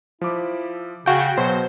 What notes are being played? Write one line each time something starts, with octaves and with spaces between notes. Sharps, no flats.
F3 E4 D6
C#3 F#4 F5 G5 G#5
B2 F#3 C5